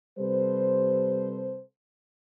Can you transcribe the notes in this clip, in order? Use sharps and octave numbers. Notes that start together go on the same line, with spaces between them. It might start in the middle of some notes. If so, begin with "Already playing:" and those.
C3 G3 A4 B4 C5